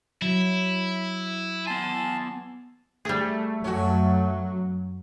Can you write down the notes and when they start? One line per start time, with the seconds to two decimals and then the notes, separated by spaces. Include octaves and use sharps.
0.22 F#3 E4
1.67 B3 G#5 A5 C6
3.05 G3 A3 G#4
3.64 F#2 F#3 C#4 F#4